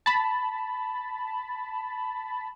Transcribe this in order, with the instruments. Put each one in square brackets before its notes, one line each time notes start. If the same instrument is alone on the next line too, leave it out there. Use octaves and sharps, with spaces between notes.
[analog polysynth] A5 B5